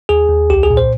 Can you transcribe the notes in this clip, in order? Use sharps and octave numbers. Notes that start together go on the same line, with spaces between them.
D#2 G#4
D#2
C2 G4
G#4
A#2
C5